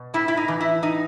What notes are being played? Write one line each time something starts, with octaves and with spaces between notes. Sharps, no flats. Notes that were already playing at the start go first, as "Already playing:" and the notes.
Already playing: B2
A2 E4
E4
D#4
E3
E4
A2 D#4